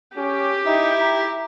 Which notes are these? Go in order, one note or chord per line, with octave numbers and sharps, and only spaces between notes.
C#4 G4
D#4 E4
A#5